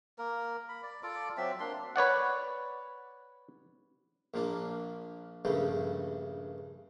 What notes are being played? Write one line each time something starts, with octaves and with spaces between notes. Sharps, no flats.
A#3 A#4
B5
D5
F4 A4 D5 D6
F#3 C4 E5
A#3 D4 C6
B4 C#5 D5 F#5
A#1 A#2 A#3 D4
A#1 G2 C#3 A3